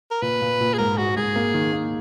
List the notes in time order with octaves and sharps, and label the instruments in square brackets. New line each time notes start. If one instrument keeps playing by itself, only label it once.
[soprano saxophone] A#4
[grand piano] A#2 [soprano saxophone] B4
[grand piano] A#2
A#2
[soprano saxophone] G#4
[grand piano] G#2 [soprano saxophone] A#4
[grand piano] G#3 [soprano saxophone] F#4
[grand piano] G#2 [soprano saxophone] G#4
[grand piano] A#3
D#3
A#3